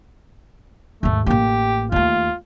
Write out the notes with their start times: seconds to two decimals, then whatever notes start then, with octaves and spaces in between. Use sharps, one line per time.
1.03 D#2 G#2 A3
1.26 A1 A#3 G4
1.92 D#2 A3 F4